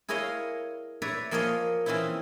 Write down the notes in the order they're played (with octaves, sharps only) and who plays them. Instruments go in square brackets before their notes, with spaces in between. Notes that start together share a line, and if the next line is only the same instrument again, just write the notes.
[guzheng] E4 G#4 A#4 C#5 D#5 F5
B4 C#5 D5 E5 A#5
F3 A#3 G#4 A#4 C#5 D#5
E3 C4 C#4 D#4 E4